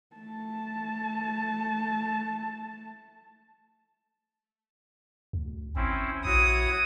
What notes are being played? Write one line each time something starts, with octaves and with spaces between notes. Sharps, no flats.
A3 A5
D2
G#1 C4 C#4 E4
A#1 E4 F#4 C#5 D#6